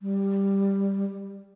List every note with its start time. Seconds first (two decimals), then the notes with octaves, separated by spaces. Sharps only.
0.01 G3